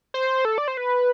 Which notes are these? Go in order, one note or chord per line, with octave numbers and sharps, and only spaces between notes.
C5
A4
D5
C5
B4